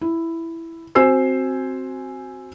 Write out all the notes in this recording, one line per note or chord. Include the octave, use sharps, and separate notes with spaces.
E4
C4 F#4 C5 G#5 E6 C7